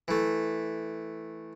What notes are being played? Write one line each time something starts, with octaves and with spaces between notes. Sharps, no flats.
E3 A3